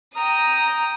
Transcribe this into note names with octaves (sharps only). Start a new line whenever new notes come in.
G5 A#5 D#6